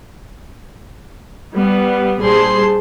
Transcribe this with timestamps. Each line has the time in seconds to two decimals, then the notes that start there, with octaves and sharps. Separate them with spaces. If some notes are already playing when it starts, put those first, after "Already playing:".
1.54 G3 B3
2.20 A#1 G3 G#4 C5 A5 C6